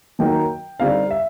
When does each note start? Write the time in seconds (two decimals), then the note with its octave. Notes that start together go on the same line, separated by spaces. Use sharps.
0.19 D#3 F#3 A#3 D#4 G5
0.80 D3 G3 C4 D#4 F5
1.11 E5